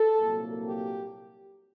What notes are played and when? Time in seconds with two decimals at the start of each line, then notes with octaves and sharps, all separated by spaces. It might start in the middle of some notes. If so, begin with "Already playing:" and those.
Already playing: A4
0.19 C2 A#2 F#3 A#3
0.63 G4